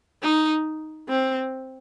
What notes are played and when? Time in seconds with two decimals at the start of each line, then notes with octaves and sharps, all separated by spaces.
0.23 D#4
1.08 C4